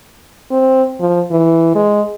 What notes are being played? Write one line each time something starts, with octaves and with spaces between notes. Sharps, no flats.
C4
F3
E3
G#3